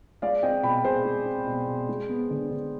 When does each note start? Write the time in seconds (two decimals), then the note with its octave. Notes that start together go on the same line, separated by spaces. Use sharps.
0.22 G#3 D5 F5
0.43 C4 D#5 G5
0.63 B2 G5 B5
0.84 B2 G#4 C5
1.05 G#3
1.25 C4
1.47 B2
1.68 B2
1.89 G#3
2.09 B3
2.30 D3
2.51 D3